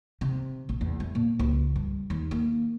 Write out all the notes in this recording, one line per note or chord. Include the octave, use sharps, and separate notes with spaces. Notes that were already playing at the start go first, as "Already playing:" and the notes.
C3
A#1
E2
A3
A#2
C#2
G2
D#2
A#3